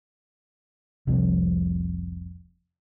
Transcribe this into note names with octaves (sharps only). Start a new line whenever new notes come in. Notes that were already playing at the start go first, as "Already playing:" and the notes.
F1 C2 F2 C3